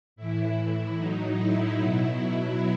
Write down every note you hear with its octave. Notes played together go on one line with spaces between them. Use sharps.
A2 E3 E4
A2 F#3 D#4
E4
B2 F#3 E4